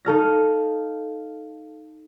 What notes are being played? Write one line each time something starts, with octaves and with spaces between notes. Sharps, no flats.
D#4 A4 F5 A#6